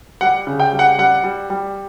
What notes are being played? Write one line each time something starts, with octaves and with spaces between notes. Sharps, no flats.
G3 F#5
C#3
G5
G3
F#5
G3 F#5
G3
G3